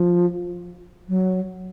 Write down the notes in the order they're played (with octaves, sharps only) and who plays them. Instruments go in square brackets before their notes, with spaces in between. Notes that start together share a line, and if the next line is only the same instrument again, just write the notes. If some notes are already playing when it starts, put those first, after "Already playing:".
Already playing: [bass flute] F3
F#3